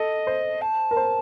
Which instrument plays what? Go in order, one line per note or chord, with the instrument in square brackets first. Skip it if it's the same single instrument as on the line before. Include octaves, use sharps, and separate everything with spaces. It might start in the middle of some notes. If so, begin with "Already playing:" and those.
Already playing: [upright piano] A4 [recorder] D#5
[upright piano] C5
[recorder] A5
[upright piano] A#4
C5